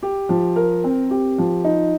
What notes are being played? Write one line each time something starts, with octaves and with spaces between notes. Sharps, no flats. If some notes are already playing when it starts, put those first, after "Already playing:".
G4
F3
A#4
C4
G4
F3
D#4